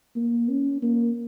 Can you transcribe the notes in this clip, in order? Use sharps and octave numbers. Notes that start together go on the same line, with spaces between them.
A#3
C#4
A#3